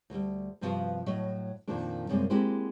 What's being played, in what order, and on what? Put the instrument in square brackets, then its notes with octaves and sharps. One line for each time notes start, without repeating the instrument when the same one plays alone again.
[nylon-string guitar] D2 G3
G2 C3 F3 B3 F#4 F5
A2 F#3 D#5
F2 A#2 D#3 F3 A#3 D4
F#2 C3 G3 G#3 A#3 C4
G#3 A#3 C4 E4 F#4 G4